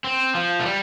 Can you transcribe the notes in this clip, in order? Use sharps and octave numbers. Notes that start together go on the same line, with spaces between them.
C4
F3
A3
G3